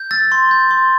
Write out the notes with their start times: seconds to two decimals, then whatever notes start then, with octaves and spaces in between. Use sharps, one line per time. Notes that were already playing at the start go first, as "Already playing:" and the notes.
Already playing: G6
0.11 E6 A6
0.32 C6
0.51 G6
0.71 C6